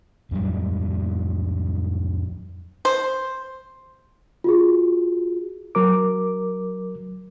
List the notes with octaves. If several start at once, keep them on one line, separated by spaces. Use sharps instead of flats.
F2 A2 F#3 G3
C5
F4 F#4 G#4
F#3 A#4 D6